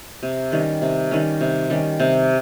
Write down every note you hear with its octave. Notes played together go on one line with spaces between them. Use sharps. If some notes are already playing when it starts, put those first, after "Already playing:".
C3
D#3 G3 C#4
C3
D#3 G3 C#4
C3
D#3 G3 C#4
C3